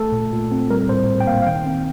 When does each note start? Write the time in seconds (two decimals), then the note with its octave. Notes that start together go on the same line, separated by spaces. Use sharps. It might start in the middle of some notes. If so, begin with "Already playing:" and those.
Already playing: A3 A4
0.12 A#2
0.33 A#2
0.51 C4
0.70 G3 A#4
0.89 A2 C5
1.09 A2
1.20 G5
1.27 A#3 F5
1.42 F5
1.47 D#3 G5
1.66 C4